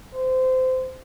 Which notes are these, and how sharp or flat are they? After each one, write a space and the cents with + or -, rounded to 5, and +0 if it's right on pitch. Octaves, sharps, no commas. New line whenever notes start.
C5 -20